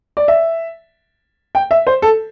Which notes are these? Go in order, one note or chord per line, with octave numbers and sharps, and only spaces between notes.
D5
E5
G5
E5
C5
A4